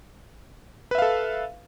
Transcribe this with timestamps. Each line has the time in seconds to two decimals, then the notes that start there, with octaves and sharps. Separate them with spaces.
0.91 B4
0.95 E5
0.98 F5
1.02 A4